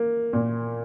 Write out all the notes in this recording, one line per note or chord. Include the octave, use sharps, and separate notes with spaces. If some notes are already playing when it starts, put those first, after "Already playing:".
Already playing: A#3
A#2